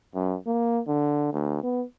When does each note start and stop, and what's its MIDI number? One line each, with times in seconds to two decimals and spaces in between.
0.15 0.36 42
0.46 0.81 58
0.87 1.29 50
1.33 1.59 38
1.63 1.84 59